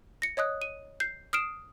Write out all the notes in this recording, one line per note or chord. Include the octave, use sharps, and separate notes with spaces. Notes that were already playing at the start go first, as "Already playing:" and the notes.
A#6 C#7
C#5 D#5 D#6 F#6
D#7
G6 C7
D#6 F6 C7 D7 E7